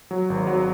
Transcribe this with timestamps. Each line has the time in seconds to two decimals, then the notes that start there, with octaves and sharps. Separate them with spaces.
0.11 F#3
0.30 G#1
0.47 F#3